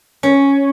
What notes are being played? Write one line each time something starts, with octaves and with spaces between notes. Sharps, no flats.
C#4